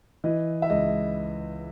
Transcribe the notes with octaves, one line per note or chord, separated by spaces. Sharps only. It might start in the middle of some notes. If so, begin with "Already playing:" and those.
E3 D#5
E5
C#2 D#5